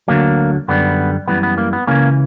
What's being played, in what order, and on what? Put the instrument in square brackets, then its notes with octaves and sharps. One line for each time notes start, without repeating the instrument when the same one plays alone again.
[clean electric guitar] D2 D3 F#3 A#3
F#2 D3 G3 B3
F#2 E3 G3 B3
B3
A#3
B3
C#2 C#3 E3 A#3 C#4